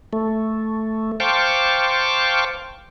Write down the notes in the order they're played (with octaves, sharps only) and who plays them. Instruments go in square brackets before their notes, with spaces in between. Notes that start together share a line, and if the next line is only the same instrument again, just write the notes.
[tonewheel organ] A3
C5 F5 G5 A5 C#6 D6